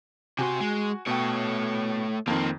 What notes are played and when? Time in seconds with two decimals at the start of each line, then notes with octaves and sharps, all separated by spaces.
0.39 C3 F#4 C5 G#5
0.61 G#3
1.07 B2 A3 C#5 G5
2.27 F2 D#3 A#3 C4